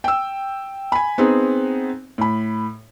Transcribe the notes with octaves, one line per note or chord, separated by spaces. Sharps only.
G5 E6
G#5 B5
B3 C4 D#4 G#4
A2 B5